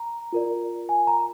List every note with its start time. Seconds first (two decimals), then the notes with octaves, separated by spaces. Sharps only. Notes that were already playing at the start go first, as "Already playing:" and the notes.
Already playing: A#5
0.33 F4 A#4 D5
0.89 G#5
1.07 A#5